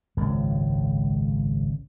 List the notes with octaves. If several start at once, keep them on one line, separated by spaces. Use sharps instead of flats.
G#1 C#2 F#2